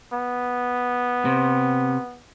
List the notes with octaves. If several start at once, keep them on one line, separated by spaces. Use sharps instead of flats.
B3
C3